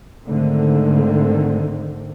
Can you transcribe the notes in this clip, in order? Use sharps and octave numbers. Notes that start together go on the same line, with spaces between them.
G#2 D3 D#3 A3 C4